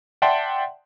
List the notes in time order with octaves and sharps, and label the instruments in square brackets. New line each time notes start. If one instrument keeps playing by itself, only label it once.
[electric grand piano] D5 E5 F#5 G5 A5 C6